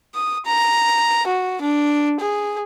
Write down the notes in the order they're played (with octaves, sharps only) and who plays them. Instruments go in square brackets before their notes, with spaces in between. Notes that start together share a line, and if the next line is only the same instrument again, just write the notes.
[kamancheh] D#6
A#5
F#4
D4
G#4